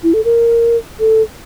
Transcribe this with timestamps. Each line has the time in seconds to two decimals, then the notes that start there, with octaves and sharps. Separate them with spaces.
0.03 E4
0.14 A4
0.25 A#4
1.00 A4